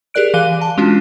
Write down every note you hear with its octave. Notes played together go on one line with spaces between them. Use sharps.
G4 G#4 A#4 D5 F#6 D7
E3 F5 F#6 D#7 G7
A5
G#3 C#4 D4 F4 F#4